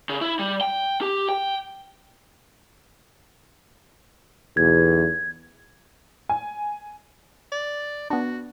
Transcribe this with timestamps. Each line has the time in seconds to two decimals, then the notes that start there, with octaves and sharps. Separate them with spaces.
0.09 C#3
0.21 E4
0.39 G3
0.61 G5
1.01 G4
1.29 G5
4.57 B1 E2 G#6
6.29 G#5
7.52 D5
8.10 B3 D4 F#4